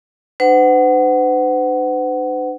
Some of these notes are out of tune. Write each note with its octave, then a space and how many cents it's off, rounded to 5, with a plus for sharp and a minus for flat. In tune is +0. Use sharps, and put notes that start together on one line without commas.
D4 +40 C5 -45 F#5 +15